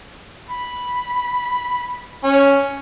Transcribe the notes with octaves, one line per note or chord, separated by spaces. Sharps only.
B5
C#4